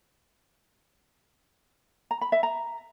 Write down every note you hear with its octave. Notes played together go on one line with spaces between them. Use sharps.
A#5
B5
E5
A#5